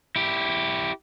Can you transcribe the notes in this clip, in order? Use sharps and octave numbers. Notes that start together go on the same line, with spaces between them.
E4 G4